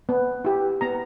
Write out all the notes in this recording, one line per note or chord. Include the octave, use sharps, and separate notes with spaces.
B3
E4 G4
B3 A#5